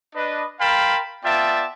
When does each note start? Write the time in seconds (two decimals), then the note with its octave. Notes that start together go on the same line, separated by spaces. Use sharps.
0.15 D4 B4 D#5
0.60 A#4 F5 G5 A5 B5 C6
1.24 B3 F4 D5 E5 G5 A5